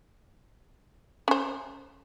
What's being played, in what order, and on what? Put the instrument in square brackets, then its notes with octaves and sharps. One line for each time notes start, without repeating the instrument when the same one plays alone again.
[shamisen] C#4 C5